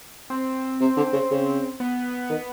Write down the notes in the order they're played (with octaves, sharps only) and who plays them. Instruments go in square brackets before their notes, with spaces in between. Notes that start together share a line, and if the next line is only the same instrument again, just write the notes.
[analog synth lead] C4
[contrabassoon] C3
D3
C#3
C#3
[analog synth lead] B3
[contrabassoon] D#3